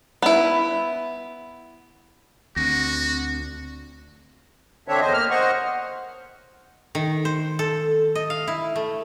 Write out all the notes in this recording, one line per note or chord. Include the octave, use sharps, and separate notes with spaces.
B3 E4
D2 C4 F#4 A#6
D3 C4 D4 C#5 E5
E2 C5 D#5
A#3 F6
C5 D#5 F#5 C#6
D#3
C5
A4
D#5
F5
E4
A3